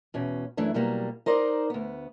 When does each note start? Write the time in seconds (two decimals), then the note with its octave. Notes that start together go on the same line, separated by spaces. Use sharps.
0.14 E2 B2 C#4
0.57 F#2 E3 A3 D4 E4
0.74 B2 F#3 G3 A#3
1.26 D#4 A#4 C5 D5
1.70 D2 B3